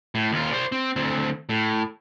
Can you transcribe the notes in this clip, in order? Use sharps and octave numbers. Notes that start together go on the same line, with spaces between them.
A2
D#2 F4
C5 D5
C4
D2 C4
A2